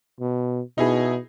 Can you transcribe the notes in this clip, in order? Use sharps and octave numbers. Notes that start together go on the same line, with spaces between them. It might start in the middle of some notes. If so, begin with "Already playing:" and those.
B2
B2 D#4 E4 G#4